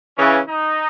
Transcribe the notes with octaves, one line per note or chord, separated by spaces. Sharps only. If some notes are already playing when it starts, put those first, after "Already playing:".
C#3 E3 C#4
D#4